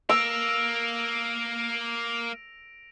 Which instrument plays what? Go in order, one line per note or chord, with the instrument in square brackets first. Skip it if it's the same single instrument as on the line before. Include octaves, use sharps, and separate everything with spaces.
[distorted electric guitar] A#3 [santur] E6 [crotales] A#6 D7 F7